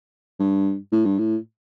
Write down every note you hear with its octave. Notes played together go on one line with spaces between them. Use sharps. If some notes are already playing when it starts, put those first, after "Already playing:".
G2
A2
G2
A2